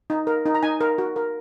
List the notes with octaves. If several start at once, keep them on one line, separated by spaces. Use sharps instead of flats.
D#4
A#4
D#4
A#5
D#4 G#5
A#4
F#4
A#4